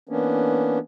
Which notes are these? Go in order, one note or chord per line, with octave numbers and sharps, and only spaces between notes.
E3 A#3 B3 C#4 D4